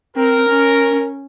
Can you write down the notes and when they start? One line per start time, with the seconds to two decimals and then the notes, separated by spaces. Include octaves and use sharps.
0.16 C4 A#4
0.49 C#4